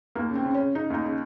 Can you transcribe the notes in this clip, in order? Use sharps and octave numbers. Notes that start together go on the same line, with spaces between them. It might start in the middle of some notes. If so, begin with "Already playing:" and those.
D#2 A#3
C#3
C4
C#3
C#4
C#3
C#3 D#4
D#2 D#4
C#3